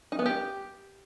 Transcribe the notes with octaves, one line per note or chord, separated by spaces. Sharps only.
D#4
B3
G4